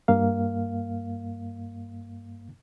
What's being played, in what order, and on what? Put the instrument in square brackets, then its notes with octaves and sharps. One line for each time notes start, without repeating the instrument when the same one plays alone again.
[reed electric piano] G2 A#3 F5